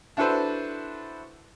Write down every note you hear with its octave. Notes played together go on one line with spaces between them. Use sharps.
D4 E4 F#4 A4 B4 C5